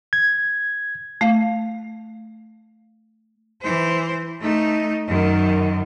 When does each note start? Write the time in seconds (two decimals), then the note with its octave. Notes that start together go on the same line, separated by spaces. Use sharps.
0.13 G#6
1.21 A3 F5
3.62 E3 C5
4.41 A3 D#4
5.08 F#2 D#3